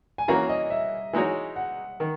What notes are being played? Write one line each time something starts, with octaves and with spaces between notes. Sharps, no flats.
G#5
E3 A#3 C#4 F#4 A#5
D#5
E5
E3 G#3 D#4 F#4 C#5
F#5
D#3